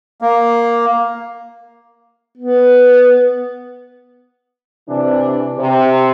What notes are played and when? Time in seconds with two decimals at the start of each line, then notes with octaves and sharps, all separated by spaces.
0.21 A#3
2.37 B3
4.88 C3 E3 D4
5.58 C3